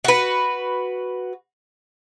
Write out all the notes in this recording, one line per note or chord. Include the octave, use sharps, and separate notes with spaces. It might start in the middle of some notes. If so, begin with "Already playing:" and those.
F#4 B4